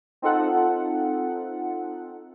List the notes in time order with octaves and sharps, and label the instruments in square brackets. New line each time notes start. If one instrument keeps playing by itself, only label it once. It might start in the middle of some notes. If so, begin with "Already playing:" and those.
[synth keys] C4 D#4 F4 A4 F#5